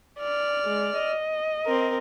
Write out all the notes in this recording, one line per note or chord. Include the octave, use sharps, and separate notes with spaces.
D5 F6
G#3
D#5
C4 A#4